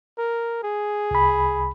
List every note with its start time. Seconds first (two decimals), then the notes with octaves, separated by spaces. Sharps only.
0.18 A#4
0.63 G#4
1.11 C2 B5